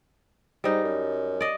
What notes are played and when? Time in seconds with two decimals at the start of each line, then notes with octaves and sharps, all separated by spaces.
0.64 G#2 G3 D#4
0.84 F#2
1.41 D5 D#5